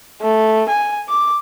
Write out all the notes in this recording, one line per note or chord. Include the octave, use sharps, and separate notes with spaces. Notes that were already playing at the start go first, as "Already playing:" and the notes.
A3
G#5
D6